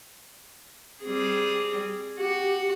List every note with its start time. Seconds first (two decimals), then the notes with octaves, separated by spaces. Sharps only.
1.03 G3 C4 G#4
2.19 F#4 G4